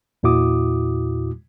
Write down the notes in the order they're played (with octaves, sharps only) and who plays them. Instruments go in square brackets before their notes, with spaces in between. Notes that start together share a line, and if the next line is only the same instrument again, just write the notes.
[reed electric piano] E2 A#2 E4 F#4 D6 D#6